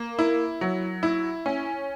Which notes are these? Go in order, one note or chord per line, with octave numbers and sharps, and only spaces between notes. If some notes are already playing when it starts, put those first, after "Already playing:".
Already playing: A#3
E4
F#3
E4
C#4